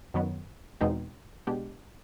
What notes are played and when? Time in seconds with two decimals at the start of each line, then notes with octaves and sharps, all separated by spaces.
0.14 F#2 D#3 F#3 B3
0.81 E2 B2 G#3 C4 D#4
1.47 B2 G#3 B3 D4 G4